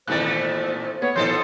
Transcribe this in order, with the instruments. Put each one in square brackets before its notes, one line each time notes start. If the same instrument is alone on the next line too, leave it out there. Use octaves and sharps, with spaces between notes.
[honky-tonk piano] G#1 E3 F#6 [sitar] A#2 A3 D5 [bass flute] C5
[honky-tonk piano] B3 [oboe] C#5
[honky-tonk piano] B1 E3 G6 [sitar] F3 A4 D#5 [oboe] C6